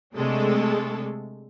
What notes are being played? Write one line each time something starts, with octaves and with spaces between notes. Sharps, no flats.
C3 G#3 A3 D4 A4